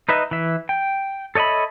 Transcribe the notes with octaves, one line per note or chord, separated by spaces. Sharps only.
D#4 B4 D#5 E5
E3 E5
G5
A4 C#5 D#5 E5 B5